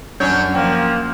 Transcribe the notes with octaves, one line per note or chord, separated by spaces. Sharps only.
F#2 C#4 D4 C#5 G6
F3 A#3 G5